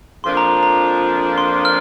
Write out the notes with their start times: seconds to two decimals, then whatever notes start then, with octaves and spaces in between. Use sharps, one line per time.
0.24 F2 F3 A#3 D4 C6
0.37 A#5
0.63 A#5
1.38 C6
1.65 F6